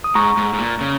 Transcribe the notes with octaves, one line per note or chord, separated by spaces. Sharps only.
D#6
G#2 A#5 C#6
G#2
G#2
A#2
C#3